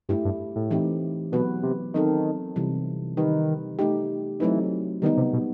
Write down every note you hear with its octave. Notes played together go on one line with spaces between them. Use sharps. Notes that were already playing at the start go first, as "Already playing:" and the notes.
G2 A3 E4 G4
G2
A2
E3 A3 C4 D#4 G4
B2 F#3 B3 F#4 B4
C3
D#3 F#3 C4 D#4 A4
C3 E3 G3
D#3 G3 D#4 G4 B4
A3 D#4 G4
E3 F#3 A3 C4 D#4
D#3 G3 B3 D#4
C3
B2